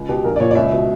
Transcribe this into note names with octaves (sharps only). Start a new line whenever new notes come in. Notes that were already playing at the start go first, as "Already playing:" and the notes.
Already playing: C#2
B2 G4
A#1 A#4
D5
A#2 C#5
D5
C#2 E5
B2